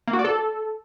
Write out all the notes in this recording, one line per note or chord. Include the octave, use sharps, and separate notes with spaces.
A#3
F#4
D5
A4